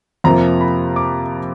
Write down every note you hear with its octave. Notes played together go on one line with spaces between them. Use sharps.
F2 C3 F3 A#3 A#5
B5
D6